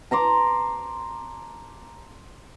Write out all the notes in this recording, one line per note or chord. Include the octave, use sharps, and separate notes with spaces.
A5 A#5 C6 D6